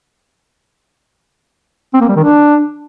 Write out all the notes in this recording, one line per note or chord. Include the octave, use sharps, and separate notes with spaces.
C4
A#3
G3
D#3
D4